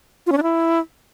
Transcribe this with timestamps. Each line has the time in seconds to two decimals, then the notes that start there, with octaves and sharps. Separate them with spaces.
0.27 F4
0.32 C#4
0.37 D4
0.43 E4